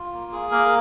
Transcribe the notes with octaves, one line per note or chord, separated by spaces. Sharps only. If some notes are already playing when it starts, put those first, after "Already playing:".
Already playing: F4
A#3
G#4
A#3 A#4